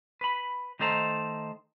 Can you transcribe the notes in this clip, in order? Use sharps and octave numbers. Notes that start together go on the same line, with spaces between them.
B4 B5
D#3 A3 D#4 A4 C5 A#5